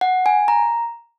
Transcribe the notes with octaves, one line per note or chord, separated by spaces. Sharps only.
F#5
G#5
A#5